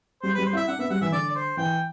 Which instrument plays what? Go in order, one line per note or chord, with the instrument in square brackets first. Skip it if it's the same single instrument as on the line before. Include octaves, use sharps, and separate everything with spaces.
[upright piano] G3 [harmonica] C5
[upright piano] G3 [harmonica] B4
[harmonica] C5
[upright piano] E4 [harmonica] E5
[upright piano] D4 [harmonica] F#5
[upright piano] B3 [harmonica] E5
[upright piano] G3 [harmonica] F#5
[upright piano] E3 [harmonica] E5
[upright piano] D3 [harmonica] D5
[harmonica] D5
C5
[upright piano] E3 [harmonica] G5